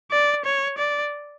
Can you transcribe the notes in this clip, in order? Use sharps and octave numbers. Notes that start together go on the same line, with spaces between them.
D5
C#5
D5